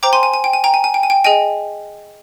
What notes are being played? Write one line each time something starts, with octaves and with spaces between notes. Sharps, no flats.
C5 G5 A#5 D6
G#5 C6
G#5
G#5
G5
G#5
G5 A#5
G#5
G#5
G5
G#5
G5
G#4 D#5 G5 G#5